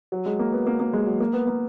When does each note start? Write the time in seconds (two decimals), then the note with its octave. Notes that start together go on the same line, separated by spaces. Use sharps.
0.12 F#3
0.26 G#3
0.39 A#3
0.52 B3
0.67 A#3
0.80 A#3
0.93 G#3
1.06 F#3
1.20 A#3
1.33 B3
1.47 A#3